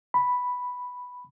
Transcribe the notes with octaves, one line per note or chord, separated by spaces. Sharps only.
B5